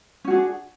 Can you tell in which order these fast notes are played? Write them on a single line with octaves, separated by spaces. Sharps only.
C#4 F#4 G#4 D4